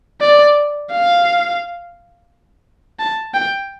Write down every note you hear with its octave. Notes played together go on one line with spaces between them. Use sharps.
D5
F5
A5
G5